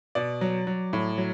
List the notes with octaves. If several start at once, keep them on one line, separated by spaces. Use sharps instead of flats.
B2 D5
F#3
F#3
A2
F#3